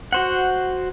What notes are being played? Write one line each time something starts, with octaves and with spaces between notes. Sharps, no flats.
F#4 C5 F#5